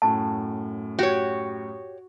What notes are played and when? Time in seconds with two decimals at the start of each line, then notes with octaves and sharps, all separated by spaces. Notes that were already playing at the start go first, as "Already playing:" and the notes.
0.02 F#2 A2 A5
0.99 F#4 G4 C#5